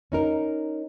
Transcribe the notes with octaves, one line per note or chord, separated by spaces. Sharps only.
C#4 D#4 A#4